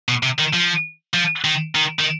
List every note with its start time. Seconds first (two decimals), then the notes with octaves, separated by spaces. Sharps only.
0.09 B2
0.23 C3
0.39 D#3
0.54 F3
1.14 F3
1.44 D#3
1.75 D#3
1.99 D#3